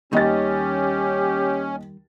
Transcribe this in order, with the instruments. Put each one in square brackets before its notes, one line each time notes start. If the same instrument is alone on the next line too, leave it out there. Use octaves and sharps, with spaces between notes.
[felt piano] D#2 D#5 A6 [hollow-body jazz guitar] D#3 G3 [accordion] C#4 [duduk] G4